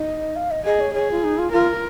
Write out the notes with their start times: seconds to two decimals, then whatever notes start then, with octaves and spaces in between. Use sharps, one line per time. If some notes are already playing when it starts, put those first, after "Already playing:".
Already playing: D#4 D#5
0.36 F5
0.51 D#5
0.65 G#4 D#5
0.80 C#5
0.94 G#4 C#5
1.11 F4
1.24 D#4
1.38 F4
1.52 F4 A#4